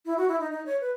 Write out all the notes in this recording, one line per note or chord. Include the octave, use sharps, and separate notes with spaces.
E4
F#4
E4
D#4
D#4
C#5
B4